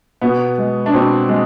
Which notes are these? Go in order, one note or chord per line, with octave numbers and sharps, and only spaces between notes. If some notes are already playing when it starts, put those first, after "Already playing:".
B2 B3
G#3
D4
B2 C4
G#3